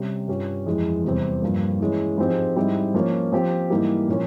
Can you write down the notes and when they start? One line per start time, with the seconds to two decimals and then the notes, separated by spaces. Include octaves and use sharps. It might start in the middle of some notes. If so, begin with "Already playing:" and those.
Already playing: C3 G3 C#4
0.28 G2 G3 C#4 F4
0.66 F2 E3 G#3
1.04 E2 C3 G3 C4
1.42 G2 F3 A#3
1.80 E3 G#3 C#4
2.18 G#2 F3 G#3 C4 G4
2.56 G#2 G3 C4 E4 G4
2.94 F3 A#3 C#4
3.32 F3 C4 G4
3.70 G#2 E3 G3 A#3
4.08 A#2 F3 A#3 C#4